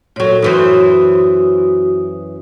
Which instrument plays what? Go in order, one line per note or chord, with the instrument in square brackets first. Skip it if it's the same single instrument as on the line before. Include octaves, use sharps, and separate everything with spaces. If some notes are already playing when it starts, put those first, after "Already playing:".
[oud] A#2 F#3 [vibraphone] A4 C#5
[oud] F#2 E3 C5 [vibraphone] F#4 D#6